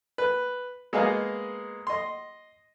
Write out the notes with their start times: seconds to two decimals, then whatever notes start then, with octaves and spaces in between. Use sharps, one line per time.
0.18 B4
0.93 G#3 A#3 B3 G#4 D#5 F5
1.87 D#5 C6